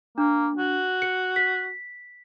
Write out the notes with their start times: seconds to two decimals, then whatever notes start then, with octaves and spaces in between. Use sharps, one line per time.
0.18 A#3 D4
0.57 F#4
1.02 C#7
1.36 B6